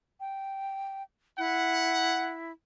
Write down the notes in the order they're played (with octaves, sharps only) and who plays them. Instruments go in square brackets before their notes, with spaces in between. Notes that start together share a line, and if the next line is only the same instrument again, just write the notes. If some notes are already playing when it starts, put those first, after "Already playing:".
[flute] G5
[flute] E4 [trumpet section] F#5